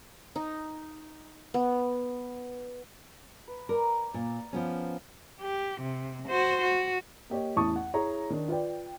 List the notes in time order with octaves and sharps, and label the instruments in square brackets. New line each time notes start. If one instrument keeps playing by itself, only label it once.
[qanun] D#4
B3
[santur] B4
[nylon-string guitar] A#4 [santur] D5 A#5
[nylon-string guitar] A#2
F3 B3 C#4
[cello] G4
C3
F#4 C5
F#4
[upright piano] A#3 G4 C#5 D#5
A1 E2 A5 C#6 D#6
F#5
E4 G#4 C#5 A#5
D#3 D4
F4 B4 D5 G5